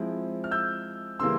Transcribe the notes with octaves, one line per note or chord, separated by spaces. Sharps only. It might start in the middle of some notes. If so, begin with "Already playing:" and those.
Already playing: F3 G#3 C4 E4
F6
E6 G6
C#3 E3 G3 A#3 C6 E6